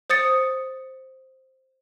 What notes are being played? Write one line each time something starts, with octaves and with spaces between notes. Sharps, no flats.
C5 D#6 A6 C#7